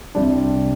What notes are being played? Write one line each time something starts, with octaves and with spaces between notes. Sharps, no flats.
C2 C3 G3 D4